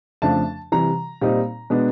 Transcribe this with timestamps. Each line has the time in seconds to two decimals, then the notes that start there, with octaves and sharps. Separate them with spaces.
0.22 F2 C#3 F3 A3 D4 A5
0.72 C3 E3 G3 A#5
1.21 A#2 G3 C4 D#4
1.70 B2 G#3 B3 D4